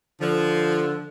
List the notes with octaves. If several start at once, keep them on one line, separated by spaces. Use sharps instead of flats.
D3 F3